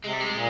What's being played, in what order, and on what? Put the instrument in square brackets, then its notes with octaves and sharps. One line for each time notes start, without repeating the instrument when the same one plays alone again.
[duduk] C3 [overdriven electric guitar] G#3
[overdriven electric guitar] G3
G#3
[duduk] A#2